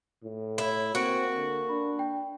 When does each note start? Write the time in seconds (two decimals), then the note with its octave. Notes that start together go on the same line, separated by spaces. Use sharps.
0.24 A2
0.58 E4 C#5 E7
0.95 A#3 C4 F#4 C#7 D7
1.35 D3
1.69 D4 B5
1.99 G5